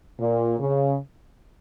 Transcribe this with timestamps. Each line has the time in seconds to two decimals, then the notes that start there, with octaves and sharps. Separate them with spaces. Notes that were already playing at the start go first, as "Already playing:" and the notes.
0.19 A#2
0.60 C#3